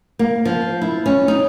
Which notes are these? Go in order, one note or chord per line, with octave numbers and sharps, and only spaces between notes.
A#3
F3
E4
C#4
D#4